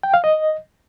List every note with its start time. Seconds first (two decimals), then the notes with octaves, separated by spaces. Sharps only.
0.03 G5
0.14 F5
0.24 D#5